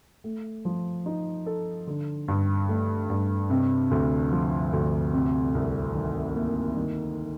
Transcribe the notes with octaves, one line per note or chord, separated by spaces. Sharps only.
A3
F3
D#4
A4
D3
G2
A3
G2
C3
D2
F3
D2
C3
C2
D#3
A#3
D#3